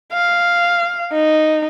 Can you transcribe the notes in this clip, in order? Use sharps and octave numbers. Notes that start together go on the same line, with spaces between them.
F5
D#4